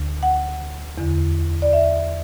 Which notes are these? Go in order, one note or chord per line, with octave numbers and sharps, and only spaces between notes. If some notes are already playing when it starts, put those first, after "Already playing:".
Already playing: D2 D3
F#5
E2 D3
D5
E5